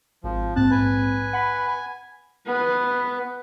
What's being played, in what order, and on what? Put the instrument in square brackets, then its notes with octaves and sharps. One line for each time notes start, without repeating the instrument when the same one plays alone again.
[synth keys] G#1 [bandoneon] F3
[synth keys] A#1 G#2 C4 [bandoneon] A5 F#6
[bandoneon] B4 G#5
[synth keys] F#5 B5 B6
[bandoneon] G#5
[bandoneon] B3 [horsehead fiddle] B4